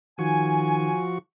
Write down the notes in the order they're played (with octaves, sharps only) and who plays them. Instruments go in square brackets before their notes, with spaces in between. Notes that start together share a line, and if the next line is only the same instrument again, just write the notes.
[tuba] D#3 [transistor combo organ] F3 F#4 C#6 [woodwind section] G#5